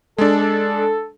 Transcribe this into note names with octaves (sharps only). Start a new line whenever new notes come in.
G#3 D4 A4